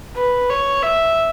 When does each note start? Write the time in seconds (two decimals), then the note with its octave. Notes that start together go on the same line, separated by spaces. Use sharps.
0.16 B4
0.50 C#5
0.82 E5